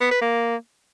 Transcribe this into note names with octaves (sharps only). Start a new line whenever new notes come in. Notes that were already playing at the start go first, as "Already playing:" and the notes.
B3
B4
A#3